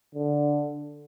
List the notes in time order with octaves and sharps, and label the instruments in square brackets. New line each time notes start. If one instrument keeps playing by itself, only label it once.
[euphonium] D3